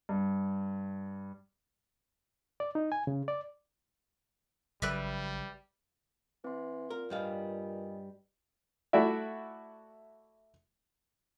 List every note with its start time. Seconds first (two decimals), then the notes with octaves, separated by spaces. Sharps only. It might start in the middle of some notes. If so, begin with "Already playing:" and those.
0.09 G2
2.60 D5
2.75 D#4
2.92 G#5
3.07 C#3
3.28 D5
4.82 A1 C#3 F#3 G3 B4 D5 E5
6.44 E3 C4 C6
6.90 A#2 A#4
7.10 G2 G3 B4 D#5 F5 G#5
8.93 A3 E4 F#4 D5 E5